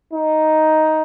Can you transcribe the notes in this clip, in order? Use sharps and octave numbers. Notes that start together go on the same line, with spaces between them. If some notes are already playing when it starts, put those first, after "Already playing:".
D#4